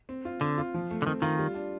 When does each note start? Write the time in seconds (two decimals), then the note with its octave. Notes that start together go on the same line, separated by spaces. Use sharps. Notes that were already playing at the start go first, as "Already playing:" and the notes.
0.09 C4
0.25 F4
0.41 D3 C4
0.58 F4
0.74 F3
0.91 A3
1.02 D3
1.06 D#3 C4
1.22 D#3 F4
1.38 G3
1.54 D4